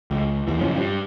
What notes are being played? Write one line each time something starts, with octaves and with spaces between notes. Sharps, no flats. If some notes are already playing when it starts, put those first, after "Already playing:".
C#2
D#2 E3
F#1 A#2 F3 C#4
G2